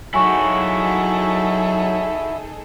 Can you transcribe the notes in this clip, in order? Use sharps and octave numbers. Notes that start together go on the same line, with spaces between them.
F#3 D#4 E4 F#4 G#4 A4 G#5 C#6